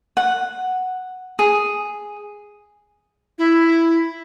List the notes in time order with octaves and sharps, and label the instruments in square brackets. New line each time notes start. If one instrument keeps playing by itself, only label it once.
[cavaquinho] F#5
G#4
[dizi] E4